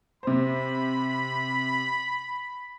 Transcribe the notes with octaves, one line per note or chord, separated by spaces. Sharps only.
C3 C5 B5